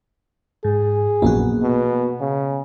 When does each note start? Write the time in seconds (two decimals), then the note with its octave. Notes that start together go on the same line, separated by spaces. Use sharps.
0.65 G#2 G#4
1.22 A#1 F#2 A#3 B3 F#4
1.62 B2
2.20 C#3